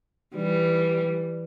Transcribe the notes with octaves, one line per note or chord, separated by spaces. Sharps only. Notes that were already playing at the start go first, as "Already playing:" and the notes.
E3 G3